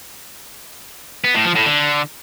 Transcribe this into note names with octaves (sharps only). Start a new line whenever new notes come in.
B3
A2
F3
A2
D3